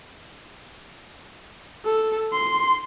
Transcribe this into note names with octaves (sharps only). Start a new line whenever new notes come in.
A4
C6